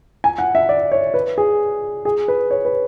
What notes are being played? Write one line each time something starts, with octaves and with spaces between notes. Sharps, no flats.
G#5
F#5
E5
D5
C#5
B4
G#4
G#4
B4
C#5
B4